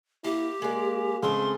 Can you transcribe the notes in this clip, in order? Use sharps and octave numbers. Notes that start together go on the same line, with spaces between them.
A#3 E4 G4
G#3 A#3 D5
C#2 A3 C4 G#4 C6